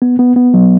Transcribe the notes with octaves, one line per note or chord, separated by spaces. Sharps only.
B3
B3
B3
F#3